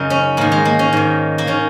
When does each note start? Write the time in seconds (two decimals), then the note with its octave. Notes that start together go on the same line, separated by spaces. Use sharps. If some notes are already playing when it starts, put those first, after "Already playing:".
Already playing: F#2 C#3 D#4
0.10 C#4
0.37 G#2 D#3 A#3
0.52 G#3
0.65 A#3
0.79 C#4
0.93 G#2 D#3
1.38 A#3
1.47 D#3 C#4